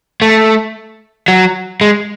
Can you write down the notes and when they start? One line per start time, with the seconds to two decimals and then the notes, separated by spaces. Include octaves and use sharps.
0.22 A3
1.28 F#3
1.81 G#3